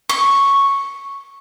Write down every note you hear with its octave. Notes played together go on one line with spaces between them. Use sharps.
C#6